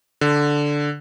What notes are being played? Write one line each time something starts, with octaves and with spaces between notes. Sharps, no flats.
D3